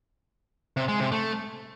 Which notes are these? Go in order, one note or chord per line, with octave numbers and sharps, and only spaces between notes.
C3
G#3
C3
A3